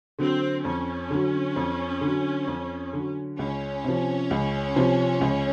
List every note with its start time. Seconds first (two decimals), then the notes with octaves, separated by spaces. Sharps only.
0.19 D3 F#3 C4
0.65 F2 C#4
1.10 D3 F#3
1.56 F2
2.01 D3
2.06 F#3
2.47 F2
2.93 D3 F#3
3.39 C#2 C#4
3.84 C3 F3
4.31 C#2
4.76 C3 F3
5.21 C#2